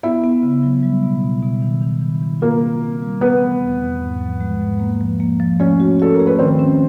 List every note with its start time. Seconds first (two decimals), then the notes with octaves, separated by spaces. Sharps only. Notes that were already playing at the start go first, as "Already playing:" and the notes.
0.03 B3 E4 E5
0.24 B3
0.43 C#3
0.63 F#3
0.83 G3
1.03 B2
1.23 B2
1.43 B2
1.62 D#3
1.82 D#3
2.02 D#3
2.22 D#3
2.41 A#3 F4 A#4
2.62 C4
2.81 C4
3.02 G3
3.21 A3 B3 B4
3.42 E3
3.61 E2
3.80 E2
4.01 G#2
4.21 F3
4.40 G#3
4.60 G#2
4.80 A#3
5.01 F3
5.20 A#3
5.40 F3
5.60 A3 C#4 C#5
5.80 F#4
6.00 F#4 A4
6.14 A#4
6.20 A3
6.27 B4
6.39 D#3 C4 C5
6.59 C#4